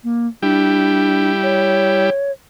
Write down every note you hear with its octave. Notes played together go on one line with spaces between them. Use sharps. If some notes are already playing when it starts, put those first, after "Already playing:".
A#3
G3 D4 E4 G4
C#5